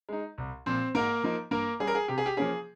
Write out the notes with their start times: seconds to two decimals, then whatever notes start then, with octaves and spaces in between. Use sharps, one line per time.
0.09 G#3 D#4
0.38 C2
0.66 A#2 F3 C4 C5
0.94 G#2 A#3 A#4
1.23 F3 A#3 D#4
1.51 G2 A#3 A#4
1.80 G3 C#4 G#4
1.87 A#4
1.95 G#4
2.08 C3 G4
2.18 G#4
2.26 G4
2.37 F3 A#3 C#4 G#4